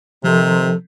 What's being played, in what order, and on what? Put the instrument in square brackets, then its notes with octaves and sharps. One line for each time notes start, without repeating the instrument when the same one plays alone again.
[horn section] C3 D#3 [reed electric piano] F3 A4